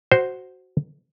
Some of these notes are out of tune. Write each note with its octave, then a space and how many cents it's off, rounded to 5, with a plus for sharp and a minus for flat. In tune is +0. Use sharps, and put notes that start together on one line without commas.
F#4 +5 C5 +0